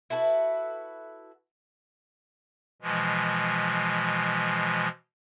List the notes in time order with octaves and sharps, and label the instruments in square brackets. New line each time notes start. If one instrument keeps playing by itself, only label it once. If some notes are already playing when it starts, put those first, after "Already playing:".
[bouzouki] E4 F#4 A4 B4
[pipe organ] B2 E3 F3 G#3